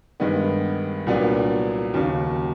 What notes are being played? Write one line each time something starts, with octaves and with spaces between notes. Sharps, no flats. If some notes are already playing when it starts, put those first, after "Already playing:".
G2 D#3 G#3 B3
C2 A#2 F#3 B3 D4
D#2 C#3 F#3